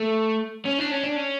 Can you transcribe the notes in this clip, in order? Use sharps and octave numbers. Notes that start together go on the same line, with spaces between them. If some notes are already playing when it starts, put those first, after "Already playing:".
Already playing: A3
C#4
D4
C#4
D4
C#4